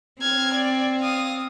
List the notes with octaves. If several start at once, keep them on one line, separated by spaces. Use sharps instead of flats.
C4 F6 G#6
D5
F5 D#6